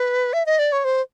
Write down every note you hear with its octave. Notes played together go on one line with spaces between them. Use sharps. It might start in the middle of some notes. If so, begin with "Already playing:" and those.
Already playing: B4
E5
D#5
D5
C#5
C5